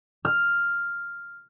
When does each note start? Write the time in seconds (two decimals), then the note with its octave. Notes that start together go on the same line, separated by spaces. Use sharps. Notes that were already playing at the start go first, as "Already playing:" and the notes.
0.25 F6